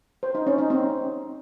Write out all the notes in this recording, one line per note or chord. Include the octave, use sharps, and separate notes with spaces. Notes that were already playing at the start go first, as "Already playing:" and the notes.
C5
D#4
C#4
D#4
C4